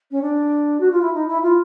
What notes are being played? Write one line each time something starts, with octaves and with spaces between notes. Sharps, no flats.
C#4
D4
F#4
F4
E4
D#4
E4
F4